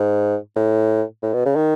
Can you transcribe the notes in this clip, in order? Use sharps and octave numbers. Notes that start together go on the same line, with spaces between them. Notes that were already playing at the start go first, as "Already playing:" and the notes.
Already playing: G#2
A2
A2
B2
C#3
D#3